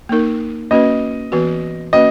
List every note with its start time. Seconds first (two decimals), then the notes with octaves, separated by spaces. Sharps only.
0.09 A#3 D#4 A#4
0.71 A#3 C#4 F#4 B4 D#5
1.32 E3 B3 F#4 B4
1.93 A#3 C#4 F#4 B4 D#5